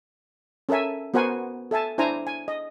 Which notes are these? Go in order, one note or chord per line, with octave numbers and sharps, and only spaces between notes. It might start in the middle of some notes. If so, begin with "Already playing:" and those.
C#4 A4 A#4 E5 G#5
B3 F#4 A#4 C5 F#5 G#5
A4 E5 G#5 A5
D4 E4 C5 G#5 A#5
G#5
D#5